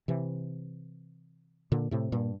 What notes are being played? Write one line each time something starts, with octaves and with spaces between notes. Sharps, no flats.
C3 E3
A#2 D3
A2 C3
G2 A#2